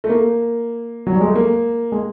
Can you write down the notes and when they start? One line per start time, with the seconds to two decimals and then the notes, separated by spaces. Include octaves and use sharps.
0.04 A3
0.09 A#3
1.07 F#3
1.14 G3
1.21 G#3
1.28 A3
1.35 A#3
1.92 G#3